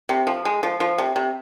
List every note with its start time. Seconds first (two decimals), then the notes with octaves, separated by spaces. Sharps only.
0.09 C3
0.27 F3
0.45 G#3
0.63 F3
0.80 F3
0.98 C3
1.16 C3